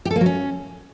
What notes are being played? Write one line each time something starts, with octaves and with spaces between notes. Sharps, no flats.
G4
A4
A#3
F#3
C#4